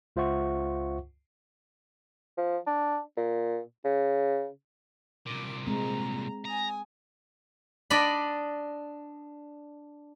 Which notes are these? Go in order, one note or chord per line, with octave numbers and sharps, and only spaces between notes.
C#2 F4 C5 E5 F#5 C#6
F3
D4
A#2
C#3
C2 A#2 D6
G#3 C4 A#5
G#5 A#5 D#6
D4 D5 D#5 B5